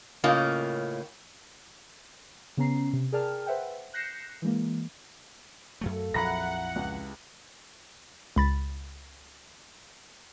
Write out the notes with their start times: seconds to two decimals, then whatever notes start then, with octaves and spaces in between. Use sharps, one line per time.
0.24 A2 C#3 A#3 C#4 F4 D#5
2.57 C#3 B3 C#4 A#5 C7
2.93 C3
3.12 G#4 A#4 D5 G5 A5 F6
3.46 B4 C5 E5 F#5 G5
3.94 F#6 G6 A#6 C7 C#7 E7
4.42 E3 G#3 A#3
5.81 F#2 F#3 A3 A4 F5
6.14 A#1 F2 F#3 E4 F#5 A#5 B5 A#6
6.76 C#2 G4
8.36 C#2 B5 A6